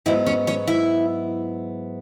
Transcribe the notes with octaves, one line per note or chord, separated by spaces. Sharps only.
G#2 F#3 B3 E4 E5
C#4 C#5
C#4 C#5
E4 E5